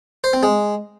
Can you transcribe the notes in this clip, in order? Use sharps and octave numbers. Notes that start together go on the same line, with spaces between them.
C5
C4
G#3